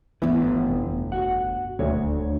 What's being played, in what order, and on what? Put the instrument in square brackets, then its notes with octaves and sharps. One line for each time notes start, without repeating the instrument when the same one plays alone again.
[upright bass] G1 D2 [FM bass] E3 [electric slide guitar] B3 E4 B4
[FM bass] F1
[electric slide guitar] F#4 F#5
[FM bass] D#1 [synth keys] D2 [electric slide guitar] C#5